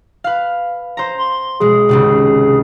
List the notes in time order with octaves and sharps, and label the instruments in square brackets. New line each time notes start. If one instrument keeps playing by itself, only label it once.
[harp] B4 F5
C5 A#5
[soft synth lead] C6
[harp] B1 G#3 [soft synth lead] G#4
[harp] G#1 C#2 C3